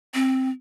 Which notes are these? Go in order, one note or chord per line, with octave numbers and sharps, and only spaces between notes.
C4